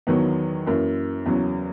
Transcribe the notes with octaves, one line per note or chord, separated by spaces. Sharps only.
E2 D#3 F#3 B3
F#2 E3 A#3
E2 C#3 F#3